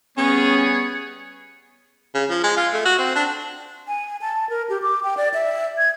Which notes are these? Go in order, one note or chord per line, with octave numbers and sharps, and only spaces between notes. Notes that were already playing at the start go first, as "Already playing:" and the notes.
G3 B3 C#4 G#4 C#5
C#3
F3
G#3
F4
A3
F#4
C4
D4
G#5
A5
A#4
G4
D6
G5
D5
E5
G#6